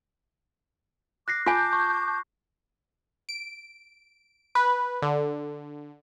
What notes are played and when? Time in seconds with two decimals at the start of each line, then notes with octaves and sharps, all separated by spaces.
1.28 D6 F#6 A#6 C7
1.47 F4 G#5 A5 D6 G6
1.73 C#6
3.29 D7
4.55 B4
5.02 D3